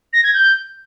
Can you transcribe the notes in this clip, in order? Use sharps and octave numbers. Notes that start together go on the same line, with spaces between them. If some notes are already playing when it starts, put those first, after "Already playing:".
A#6
G#6
G6